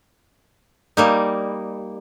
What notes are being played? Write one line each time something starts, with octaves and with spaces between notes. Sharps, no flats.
G3 A#3 D#4